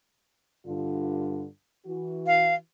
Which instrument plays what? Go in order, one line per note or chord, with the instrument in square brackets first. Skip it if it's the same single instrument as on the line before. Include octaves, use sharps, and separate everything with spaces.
[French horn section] G2 D3 F4
E3 F#4
[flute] F5